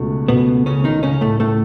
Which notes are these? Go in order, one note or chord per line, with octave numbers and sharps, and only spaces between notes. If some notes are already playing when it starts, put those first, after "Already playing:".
Already playing: C#2 B2 A3 C#4
B2 B3
C#3 C#4
D#3 D#4
C#3 C#4
A2 A3
A2 A3